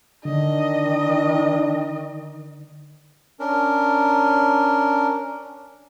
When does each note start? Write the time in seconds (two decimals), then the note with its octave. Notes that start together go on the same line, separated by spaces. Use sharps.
0.25 D3 D#3 D4 D#5
3.40 C#4 D4 A#4